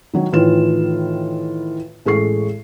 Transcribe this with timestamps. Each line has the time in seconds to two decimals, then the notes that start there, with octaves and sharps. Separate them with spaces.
0.14 D#3 F#3 C#5
0.33 A2 D#3 E3 F4 B4 E7
2.05 A1 G#3 A4 C#6 C7